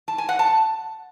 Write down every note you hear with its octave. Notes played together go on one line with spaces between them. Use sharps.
A5
G#5
F#5
A5